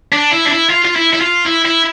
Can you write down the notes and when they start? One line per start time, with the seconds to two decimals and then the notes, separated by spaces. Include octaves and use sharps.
0.12 D4
0.32 E4
0.46 D4
0.51 E4
0.70 F4
0.85 F4
0.96 E4
1.13 E4
1.21 F4
1.46 E4
1.65 E4